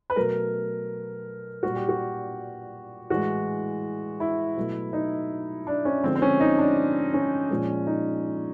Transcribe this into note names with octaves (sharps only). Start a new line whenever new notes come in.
B4
B2 F#3 A3 A#4
A#2 G3 F#4
G4
F#4
A2 E3 G#3 F#4
E4
B2 F#3 A3
D#4
D4
C#4
D3 F3 G#3 C4
C4
C#4
D#4
D4
C#4
A#2 F3 G#3
D#4